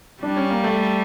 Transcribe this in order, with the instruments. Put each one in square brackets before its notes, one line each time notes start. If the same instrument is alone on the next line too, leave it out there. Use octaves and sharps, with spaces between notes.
[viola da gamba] G3 [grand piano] D4
[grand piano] C#4
A#3
A3